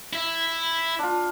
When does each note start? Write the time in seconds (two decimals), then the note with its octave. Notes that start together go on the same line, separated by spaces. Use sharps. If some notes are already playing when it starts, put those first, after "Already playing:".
0.13 E4 E5
0.99 D4 F4